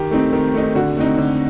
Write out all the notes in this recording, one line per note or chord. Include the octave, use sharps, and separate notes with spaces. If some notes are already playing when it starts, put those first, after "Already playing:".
Already playing: D#3 G4
A3 C4 D#4
D#3
A3 C4 D#4
D3 F#4
A3 C4 D#4
D3